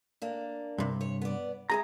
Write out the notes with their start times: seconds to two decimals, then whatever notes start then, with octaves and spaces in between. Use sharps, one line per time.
0.22 A#3 D4
0.78 G2 C3
1.01 C#5
1.21 B3 D5
1.70 G#3 E4 G#4 A#5